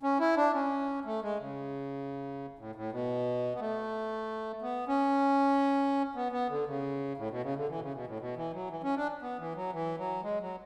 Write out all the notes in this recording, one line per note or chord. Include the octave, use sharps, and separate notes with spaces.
C#4
E4
D4
C#4
A3
G#3
C#3
A2
A2
B2
B3
A3
B3
C#4
B3
B3
D3
C#3
A2
B2
C#3
D3
E3
B2
C#3
B2
A2
B2
E3
F#3
E3
C#4
D4
B3
E3
F#3
E3
F#3
G#3
F#3